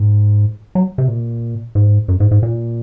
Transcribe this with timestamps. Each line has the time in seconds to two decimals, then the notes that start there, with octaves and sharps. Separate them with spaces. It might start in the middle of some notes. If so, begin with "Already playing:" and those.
Already playing: G#2
0.75 F#3
0.98 C3
1.08 A#2
1.75 G#2
2.08 F#2
2.20 G#2
2.31 G#2
2.43 A#2